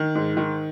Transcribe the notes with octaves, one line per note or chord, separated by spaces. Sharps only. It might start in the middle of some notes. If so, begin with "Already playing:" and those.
Already playing: D#3
G#2
D#3